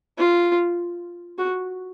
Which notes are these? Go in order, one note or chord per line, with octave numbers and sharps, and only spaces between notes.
F4
F#4